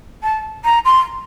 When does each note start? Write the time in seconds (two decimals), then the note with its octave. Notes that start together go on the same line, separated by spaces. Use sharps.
0.23 A5
0.65 A#5
0.85 C6